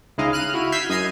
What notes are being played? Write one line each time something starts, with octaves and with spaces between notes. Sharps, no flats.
C#2 G#2 G#3 E4 D#5 F5
F6 F#6 D#7
E4 F#4
E6 F6 G6 G#6 B6 C7
F#2 D#5 G#6 C7 D#7